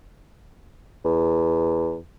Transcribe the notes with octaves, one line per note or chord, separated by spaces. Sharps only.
E2